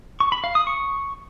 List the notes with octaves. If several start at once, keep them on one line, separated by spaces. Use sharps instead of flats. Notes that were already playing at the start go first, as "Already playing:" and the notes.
C#6
B5
F5
D#6
C#6